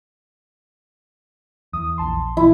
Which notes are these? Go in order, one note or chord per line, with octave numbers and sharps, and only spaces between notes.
E2 D#6
A#1 A5 C6
A#2 E3 E4